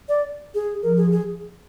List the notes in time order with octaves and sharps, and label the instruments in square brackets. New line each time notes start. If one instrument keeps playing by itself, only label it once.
[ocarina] D5
G#4
[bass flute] F3 [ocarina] A#4
[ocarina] G#4
G#4